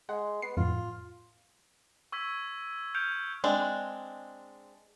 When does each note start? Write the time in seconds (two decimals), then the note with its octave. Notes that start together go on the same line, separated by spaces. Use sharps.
0.09 G#3 F#5
0.42 B3 C7
0.57 F2 A2 F4
2.12 C#6 E6 G#6 B6
2.94 F6 G6 C#7 D7 F7
3.44 G#3 C4 D4